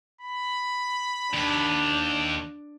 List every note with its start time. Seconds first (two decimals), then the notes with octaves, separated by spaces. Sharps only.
0.21 B5
1.34 D#2 D4